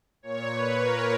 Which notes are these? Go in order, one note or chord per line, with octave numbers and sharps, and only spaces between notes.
A#2 C#5
B4
A#4